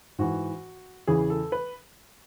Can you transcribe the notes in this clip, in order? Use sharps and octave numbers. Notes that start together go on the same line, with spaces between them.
G#2 E3 F#4
E2 C#3 E3 G#4
A4
B4